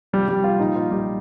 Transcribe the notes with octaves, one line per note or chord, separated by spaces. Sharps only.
C3 F3 G3 G4
G3 G4
F4
A#2 F3 D#4
F4
G3 G4